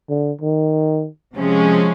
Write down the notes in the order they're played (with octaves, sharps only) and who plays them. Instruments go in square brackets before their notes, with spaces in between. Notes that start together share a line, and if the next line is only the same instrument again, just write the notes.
[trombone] D3
D#3
[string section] C3 F3 G#3 C#4